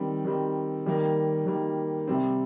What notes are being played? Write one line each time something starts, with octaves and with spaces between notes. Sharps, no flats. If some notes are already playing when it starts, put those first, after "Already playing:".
Already playing: D#3 G3 C4
D#3 G3 C4
D#3 G3 A#3
D#3 G3 A#3
C3 G3 C4